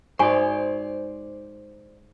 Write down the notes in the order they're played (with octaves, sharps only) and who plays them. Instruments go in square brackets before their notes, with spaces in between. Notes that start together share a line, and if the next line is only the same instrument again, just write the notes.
[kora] G#2 [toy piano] F#4 G#5 C#6 [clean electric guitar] C5 D5